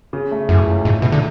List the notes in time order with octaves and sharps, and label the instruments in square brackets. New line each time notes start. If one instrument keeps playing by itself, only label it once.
[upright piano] C#3
A3
[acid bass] F#2 [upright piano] E3
[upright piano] C#2
[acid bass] G#2 [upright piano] C#3
[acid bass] B2 [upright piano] A3
[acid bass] D3